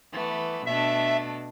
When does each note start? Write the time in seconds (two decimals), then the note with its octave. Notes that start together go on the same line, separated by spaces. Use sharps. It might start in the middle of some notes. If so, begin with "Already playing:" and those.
0.12 E3 A3 B3
0.66 B2 A3 D4 E5